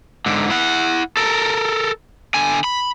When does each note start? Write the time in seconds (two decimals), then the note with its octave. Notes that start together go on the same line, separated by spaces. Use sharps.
0.26 G#2 D3
0.50 E4 F#5
1.17 A4 A#4
2.34 D3 G#5
2.64 B5